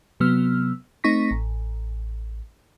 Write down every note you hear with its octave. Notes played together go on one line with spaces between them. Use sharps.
C3 F#3 B3 E6 F6
A3 C4 D#4 C#6 A#6 B6
A1